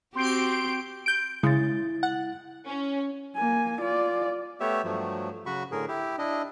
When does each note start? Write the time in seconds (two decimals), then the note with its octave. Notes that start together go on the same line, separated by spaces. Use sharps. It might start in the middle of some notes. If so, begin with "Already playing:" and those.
0.16 C4 F#4 G4 C6 G6 D7
1.06 G6 D7
1.43 C#3 G#3 E4 A6
2.03 F#5
2.67 C#4
3.36 A#3 G#5
3.81 F4 D5
4.60 A3 B3 G4 C#5 E5
4.84 G2 F3 F#3 A3
5.46 C#3 F#3 F#4 B5 C#6
5.72 A2 D3 G#4 A#4
5.88 E4 G4
6.19 D4 E4 D#5